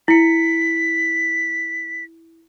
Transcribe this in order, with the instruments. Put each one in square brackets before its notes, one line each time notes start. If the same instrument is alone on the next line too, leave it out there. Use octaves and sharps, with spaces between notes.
[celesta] E4 C#7 [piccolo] B6